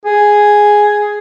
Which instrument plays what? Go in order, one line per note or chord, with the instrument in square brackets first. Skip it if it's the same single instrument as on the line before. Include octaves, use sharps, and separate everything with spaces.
[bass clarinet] G#4